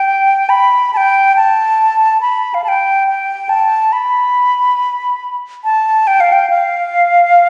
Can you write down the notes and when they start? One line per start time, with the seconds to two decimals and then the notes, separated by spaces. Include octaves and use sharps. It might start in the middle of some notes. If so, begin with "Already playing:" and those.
Already playing: G5
0.49 B5
0.93 A5
0.97 G5
1.36 A5
2.21 B5
2.54 F5
2.64 A5
2.68 G5
3.08 G5
3.49 A5
3.93 B5
5.64 A5
6.07 G5
6.20 F5
6.32 G5
6.50 F5